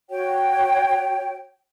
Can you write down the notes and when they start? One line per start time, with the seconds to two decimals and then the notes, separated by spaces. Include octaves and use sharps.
0.10 F#4 C#5 G5